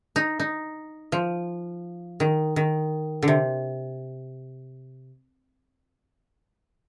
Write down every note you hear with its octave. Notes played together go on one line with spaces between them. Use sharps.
D#4
D#4
F3
D#3
D#3
D3
C3